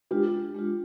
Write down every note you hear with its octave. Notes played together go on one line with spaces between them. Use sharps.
G#3 D4 F4 G4
G#3 D4 F4